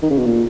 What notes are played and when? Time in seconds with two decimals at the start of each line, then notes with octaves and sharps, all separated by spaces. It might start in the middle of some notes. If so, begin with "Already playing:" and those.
0.03 D#3
0.10 C#3
0.18 B2
0.25 A#2